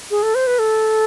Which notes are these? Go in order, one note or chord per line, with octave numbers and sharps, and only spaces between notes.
G#4
A4
C5
B4
A4